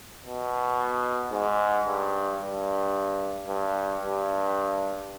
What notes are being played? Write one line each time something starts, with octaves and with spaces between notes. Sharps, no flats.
B2
G#2
G2
G2
G2
G2